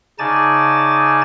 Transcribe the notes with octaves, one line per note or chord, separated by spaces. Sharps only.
C#3 D#4 D5 G#5 A5 A6